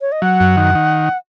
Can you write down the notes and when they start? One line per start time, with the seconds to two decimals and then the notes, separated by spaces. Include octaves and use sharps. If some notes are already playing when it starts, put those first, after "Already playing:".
0.01 C#5
0.12 D#5
0.22 F#3 F#5
0.40 F#2
0.57 D#3
0.75 D#3